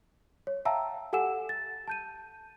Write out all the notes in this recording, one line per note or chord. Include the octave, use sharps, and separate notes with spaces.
C#5
E5 F5 G5 A5 A#5 E6
G4 A4 F#5 G#5 E6 E7
A6
A5 G6 D#7